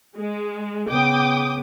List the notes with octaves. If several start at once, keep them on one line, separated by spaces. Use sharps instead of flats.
G#3
C#3 B3 G5 D6 D#6